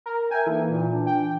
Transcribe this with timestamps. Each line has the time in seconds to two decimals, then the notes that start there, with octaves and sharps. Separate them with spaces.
0.06 A#4
0.31 A#4 E5 G5 G#5
0.46 E3 A#3 D#4 A4
0.69 A#2
0.91 E3 D4
1.06 G5